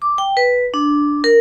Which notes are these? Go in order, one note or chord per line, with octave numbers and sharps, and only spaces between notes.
D6
G5
B4
D4
A#4